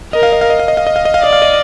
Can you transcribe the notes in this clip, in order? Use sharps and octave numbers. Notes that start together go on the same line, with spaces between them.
A#4 D#5
F5
D#5
F5
D#5
F5
D#5
F5
D#5
F5
D#5
F5
D5 D#5
F5
D#5